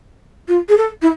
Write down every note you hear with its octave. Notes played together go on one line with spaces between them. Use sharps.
F4
G#4
A4
E4